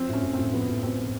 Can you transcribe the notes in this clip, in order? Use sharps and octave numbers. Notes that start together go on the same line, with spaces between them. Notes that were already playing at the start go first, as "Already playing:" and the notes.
Already playing: F3 C4
A2 C#4
A2
A2 C4
F3 B3
A2
A2 C4
F3